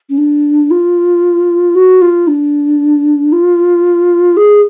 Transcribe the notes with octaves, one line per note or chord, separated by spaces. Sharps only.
C#4
D4
F4
F#4
F4
D4
F4
G#4